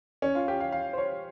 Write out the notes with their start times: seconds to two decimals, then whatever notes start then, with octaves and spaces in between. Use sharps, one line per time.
0.22 C#4
0.35 F4
0.48 G4
0.60 F5
0.72 F5
0.93 C5
0.98 C#5